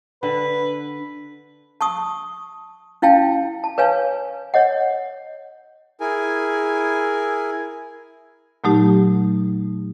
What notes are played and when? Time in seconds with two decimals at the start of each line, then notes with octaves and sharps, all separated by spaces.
0.23 D3 B4
1.81 A5 C#6 D#6
3.02 C#4 E4 F5 G5 A5
3.64 A5
3.78 B4 C#5 F5 G#5
4.54 C#5 D#5 F#5
6.01 E4 G#4 A#4 G#5
8.64 A#2 F#3 A3 D#4 G4